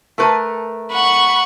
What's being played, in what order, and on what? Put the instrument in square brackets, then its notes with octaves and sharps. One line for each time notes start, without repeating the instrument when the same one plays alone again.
[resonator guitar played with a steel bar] A3 A#4 B4
[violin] F#5 C#6 [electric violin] B5